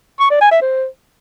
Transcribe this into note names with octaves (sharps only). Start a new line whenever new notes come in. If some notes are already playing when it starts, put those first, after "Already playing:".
C#6
D5
G#5
E5
C5